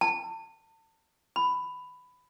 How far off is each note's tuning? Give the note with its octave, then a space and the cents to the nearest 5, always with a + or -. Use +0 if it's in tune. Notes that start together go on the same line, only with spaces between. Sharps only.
A5 +35
B5 +10